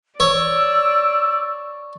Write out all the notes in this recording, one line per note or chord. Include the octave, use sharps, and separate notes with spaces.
C#5 D5 E6